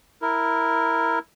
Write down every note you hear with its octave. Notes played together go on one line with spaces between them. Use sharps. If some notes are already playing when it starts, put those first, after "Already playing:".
E4 A#4